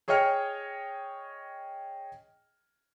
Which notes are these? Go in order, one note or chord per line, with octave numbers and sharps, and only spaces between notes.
G#4 C#5 D#5 G5 F6 C#7